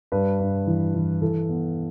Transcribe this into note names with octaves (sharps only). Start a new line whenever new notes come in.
G2 B4
G2
E3
E3
E3 A4
B3